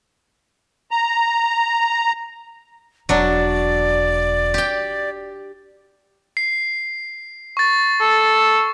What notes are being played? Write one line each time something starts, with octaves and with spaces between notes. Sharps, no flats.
A#5
E1 F#3 D4 D5
G4 G5
C7
C#6 A6
A4